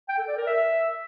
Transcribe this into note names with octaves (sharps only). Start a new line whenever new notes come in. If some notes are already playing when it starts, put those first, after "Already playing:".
G5
A4
D5
A#4
E5